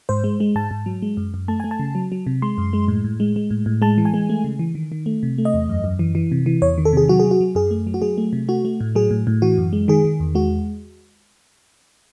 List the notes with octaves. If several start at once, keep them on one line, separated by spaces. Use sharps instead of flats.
G#2 C5
G#3
G#3
G#2 A5
G#2
F#3
G#3
F#2
F#2
A3 A5
A3 G#5
A5
C#3
F#3
F#3
C3
G#3 C6
F#2
G#3
A2
A2
G#3
G#3
A2
A2
G#3 A5
E3
G#5
G#3
A3
C#3
E3
D#3
D#3
A3
C3
A3
D#5
E2
F#2
F#2
E3
E3
C3
E3
E2 C#5
D#3
A4
C3 G#4
F#3 F#4
G#4
F#3
F#4
F#3
F#2 G#4
A3
F#3
F#4
F#3 G#4
A3
C3
A3 F#4
A3
A2
F#3 G#4
A2
A2
E3 F#4
F#2
G#3
D#3 G#4
D#3
E2
G#3 F#4